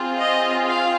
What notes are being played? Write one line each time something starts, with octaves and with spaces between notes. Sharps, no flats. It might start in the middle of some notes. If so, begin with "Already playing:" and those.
Already playing: C4 F4 G#4
D#5
F5